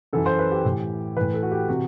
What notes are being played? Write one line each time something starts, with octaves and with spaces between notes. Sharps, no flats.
F#2 E3 A4
C5
B4
G4
A2 E3
A2 E3 B4
A4
F#4
G4
C3 E3 F#4